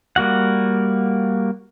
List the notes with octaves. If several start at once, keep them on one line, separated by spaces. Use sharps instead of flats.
G3 A#3 F#4 F#5